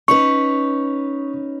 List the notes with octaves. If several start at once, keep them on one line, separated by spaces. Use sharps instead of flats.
C#4 D#4 B4 C#6